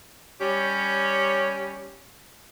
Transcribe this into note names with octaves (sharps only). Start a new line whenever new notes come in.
G3 C#4 G4 C#5